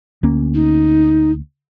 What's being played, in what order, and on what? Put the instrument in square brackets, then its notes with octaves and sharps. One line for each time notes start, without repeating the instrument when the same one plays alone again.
[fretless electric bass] D2 A#3 C#4
[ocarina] D#4